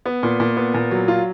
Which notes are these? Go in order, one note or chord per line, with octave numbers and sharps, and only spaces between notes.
B3
A#2
A#2
B3
A#2
F#3
F4